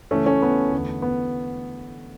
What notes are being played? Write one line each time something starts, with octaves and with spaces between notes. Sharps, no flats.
C#2 C#3 E3 A3 C#4
A3 C#4
B3
E2 D3 A3
B3